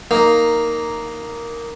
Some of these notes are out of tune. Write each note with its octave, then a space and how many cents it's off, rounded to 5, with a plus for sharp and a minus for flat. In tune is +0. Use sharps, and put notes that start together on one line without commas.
A#3 +0 D#4 +0